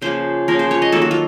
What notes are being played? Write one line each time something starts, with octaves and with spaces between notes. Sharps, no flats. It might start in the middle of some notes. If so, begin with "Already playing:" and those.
C#3 F3 A#3 C5
C#3 F3 A#3 A#4
C5
C#5
D#5
D#3 F#3 A#3 A4
F#4
F4